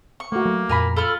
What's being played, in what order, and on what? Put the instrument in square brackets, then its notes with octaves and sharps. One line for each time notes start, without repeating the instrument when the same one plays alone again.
[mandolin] C#6
[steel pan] A3 F#4 [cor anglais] A#3
[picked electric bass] F#3 [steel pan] A3
[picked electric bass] F2 A#2 [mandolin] A#4 G#5 B5
[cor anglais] F4 [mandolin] A4 B5 F6